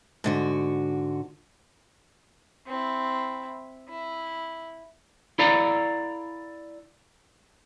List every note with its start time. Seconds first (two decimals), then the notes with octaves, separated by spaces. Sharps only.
0.24 G#2 D3 F#4
2.67 C4 E4
3.89 E4
5.39 E4 A4 D5 F5 A#5